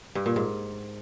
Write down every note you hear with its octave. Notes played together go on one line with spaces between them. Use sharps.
G2
A#2
G#2